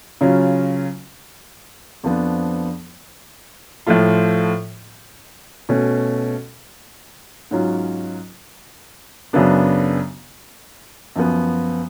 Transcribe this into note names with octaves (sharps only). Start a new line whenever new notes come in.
C#3 F#3 C#4 F4
F2 F3 B3 D4
A2 F3 A3 F4
B2 A3 C#4
G#2 F#3 C#4 F4
F#2 C#3 F#3 B3 D4
F#2 F3 B3